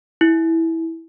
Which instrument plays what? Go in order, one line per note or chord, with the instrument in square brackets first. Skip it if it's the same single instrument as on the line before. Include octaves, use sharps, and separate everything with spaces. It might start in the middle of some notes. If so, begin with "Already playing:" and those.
[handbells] E4